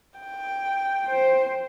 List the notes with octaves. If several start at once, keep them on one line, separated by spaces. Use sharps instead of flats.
G5
C5